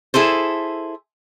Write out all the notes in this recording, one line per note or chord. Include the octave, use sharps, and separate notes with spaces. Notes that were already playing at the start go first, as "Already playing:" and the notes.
E4 G#4 A4 C5